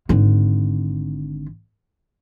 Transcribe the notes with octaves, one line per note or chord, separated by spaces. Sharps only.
G#1 D3